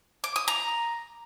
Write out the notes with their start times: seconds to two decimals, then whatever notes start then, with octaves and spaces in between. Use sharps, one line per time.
0.24 D6
0.36 D#6
0.48 A#5